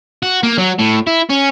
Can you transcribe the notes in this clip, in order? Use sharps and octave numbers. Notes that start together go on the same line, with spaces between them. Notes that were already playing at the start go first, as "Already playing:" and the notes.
F#4
A#3
F#3
A2
E4
C#4